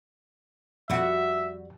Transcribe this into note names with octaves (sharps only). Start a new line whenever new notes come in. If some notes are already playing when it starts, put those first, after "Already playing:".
F2 G3 F#4 E5